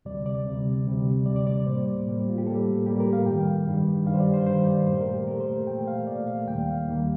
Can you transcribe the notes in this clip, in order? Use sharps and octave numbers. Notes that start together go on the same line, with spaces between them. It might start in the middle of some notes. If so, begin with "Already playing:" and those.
D2 C3 G3 D5
D5
D2 C3 G3
D2 C3 G3
D2 C3 G3 D5
D5
D5
A2 G3 A#3 C5
A2 G3 A#3
F4
G4
A2 G3 A#3 A4
A2 G3 A#3 G4
A#4
F5
G2 D#3 G3 G5
G2 D#3 G3
G2 D#3 G3 F5
C5
D5
C5
G2 D#3 G3 C5
D5
A#2 A3 C5
A#4
G4
A#2 A3 A#4
C5
A#2 A3 G5
F5
A#2 A3 D5
F5
D#2 D#3 G3 A#3 G5
F5
D#2 D#3 G3 A#3